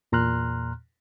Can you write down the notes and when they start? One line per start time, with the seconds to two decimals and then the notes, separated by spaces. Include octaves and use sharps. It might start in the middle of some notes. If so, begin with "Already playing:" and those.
0.12 E2 A#2 A#5 C6 F6 F#6